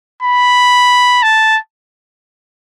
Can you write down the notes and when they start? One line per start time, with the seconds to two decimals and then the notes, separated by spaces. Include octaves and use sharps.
0.23 B5
1.23 A5